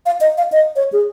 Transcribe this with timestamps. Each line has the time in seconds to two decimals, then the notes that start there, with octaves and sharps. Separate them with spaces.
0.06 F5
0.21 D#5
0.38 F5
0.52 D#5
0.76 C#5
0.93 G#4